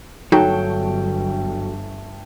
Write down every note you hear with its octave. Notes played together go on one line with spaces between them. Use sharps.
G1 F#3 A3 D#4 F#4 A4 G5